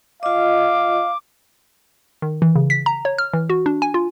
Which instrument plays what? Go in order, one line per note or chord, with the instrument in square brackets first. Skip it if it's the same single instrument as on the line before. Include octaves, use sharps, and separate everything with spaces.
[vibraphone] F4 D#5 [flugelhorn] F5 [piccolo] D6
[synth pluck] D#3
E3
C#3
B6
A#5
C#5
F6
E3
F#4
D4
G#5
F4